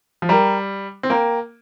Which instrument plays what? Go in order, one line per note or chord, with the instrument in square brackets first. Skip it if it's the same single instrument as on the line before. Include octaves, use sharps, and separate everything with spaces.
[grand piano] F3
[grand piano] G3 [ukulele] A#4 G5 A#5
[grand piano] C4
[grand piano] A#3 [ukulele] A#4 G5 A#5